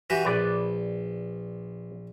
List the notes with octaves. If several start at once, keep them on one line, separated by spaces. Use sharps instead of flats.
E3 F#4 G4
A#1 B4 D5